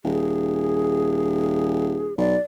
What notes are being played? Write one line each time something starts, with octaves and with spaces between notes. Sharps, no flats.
D#1 G#4
B1 D5